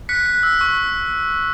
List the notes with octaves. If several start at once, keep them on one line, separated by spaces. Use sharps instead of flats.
F#6 B6 C#7
F#6
E6
C#6